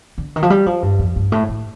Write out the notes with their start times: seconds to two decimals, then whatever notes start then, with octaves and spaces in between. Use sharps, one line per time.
0.18 D3
0.36 D#3
0.42 F3
0.50 G3
0.66 F3
0.83 G2
0.99 F2
1.16 G2
1.32 A2
1.49 A2